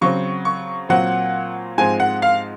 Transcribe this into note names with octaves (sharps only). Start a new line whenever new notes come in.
C#3 F#3 C4 C#6
C#6
A#2 F#3 C4 F#5
G#2 F3 G#3 C4 G#5
F#5
F5